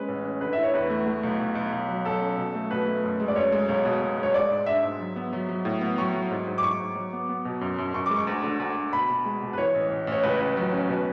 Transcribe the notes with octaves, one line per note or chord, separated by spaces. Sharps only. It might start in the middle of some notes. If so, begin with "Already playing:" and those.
Already playing: G#3 C#4 B4
A1
C#4
D3 B4
E4 E5
C#5
E2 B4
A3
A3
B1
B1
B1
B1
F#3
F#3 A4
C#4
B2
A3
B2 B4
A3
F#2
G#3
D5
F#2 C#5
G#3
B1 C#5
B2
B2
G#3
C#5
G#3 D5
G#2
D4 E5
G#2
F#3
B3
F#3
F#3
A2
B3
F#3 C#6
F#3
G#2
G#2
D6
G#2 C#6
G#2
F#3
B3
B3
B2
F#2
F#2
F#2 C#6
G#3 D6
C#6
D2
D3
D2
D2
B2 B5
B2
G#3
B2
B4
E3 C#5
A1
A1
A1
C#5
C#2 B4
C#2
F#3
C#4
B2 B4